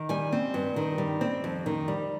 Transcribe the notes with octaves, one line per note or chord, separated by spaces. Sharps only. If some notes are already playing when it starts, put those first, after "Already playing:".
Already playing: D#3
G3 G#5
C4
G2
D#3
G3
C4
F2
D#3
G3